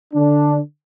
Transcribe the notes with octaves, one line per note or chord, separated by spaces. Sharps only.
D3 D4